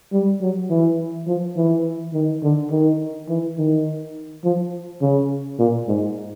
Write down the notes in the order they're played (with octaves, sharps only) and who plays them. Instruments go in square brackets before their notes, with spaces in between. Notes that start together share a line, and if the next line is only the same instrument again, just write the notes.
[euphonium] G3
F#3
E3
F3
E3
D#3
D3
D#3
E3
D#3
F3
C#3
A#2
G#2